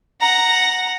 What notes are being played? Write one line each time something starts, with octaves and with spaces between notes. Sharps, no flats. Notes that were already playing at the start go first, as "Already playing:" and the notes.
F#5 A#5